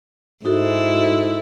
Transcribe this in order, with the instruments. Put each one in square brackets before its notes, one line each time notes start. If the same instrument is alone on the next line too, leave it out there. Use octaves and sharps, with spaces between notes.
[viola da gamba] G#2 E4 [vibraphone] D#4 F#4 A4